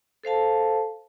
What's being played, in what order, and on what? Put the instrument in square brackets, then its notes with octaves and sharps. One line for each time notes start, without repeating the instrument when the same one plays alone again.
[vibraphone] A4 C5 F5 A5